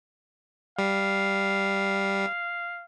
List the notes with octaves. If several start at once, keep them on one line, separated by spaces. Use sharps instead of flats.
G3 F5